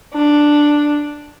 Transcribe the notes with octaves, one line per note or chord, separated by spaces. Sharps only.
D4